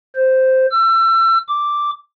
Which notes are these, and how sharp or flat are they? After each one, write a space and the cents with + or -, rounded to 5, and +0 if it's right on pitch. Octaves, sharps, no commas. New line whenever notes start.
C5 -5
E6 +30
D6 +0